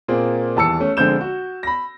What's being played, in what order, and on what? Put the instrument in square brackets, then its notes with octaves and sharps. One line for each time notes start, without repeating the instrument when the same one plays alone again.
[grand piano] A#2 A#3 C4 G#4
D#1 E2 A5 E6 C#7
A3 C#4
A#1 D3 G#3 C4 G6 E7
F#4
B5 A#6